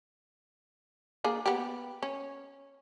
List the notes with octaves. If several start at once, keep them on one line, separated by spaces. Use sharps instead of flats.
A#3 D4 G#4
B3 G4
C#4